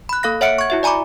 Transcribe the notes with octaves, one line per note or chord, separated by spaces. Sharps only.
B5 F#6
A#3 A4 F5 F#6 A#6
C#5 E5 F#5 F6 C#7 D7
C#6 G#6
E4 F#4 E5
D5 G#5 A#5 B5 D6